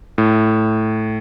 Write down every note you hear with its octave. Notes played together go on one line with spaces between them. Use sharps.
A2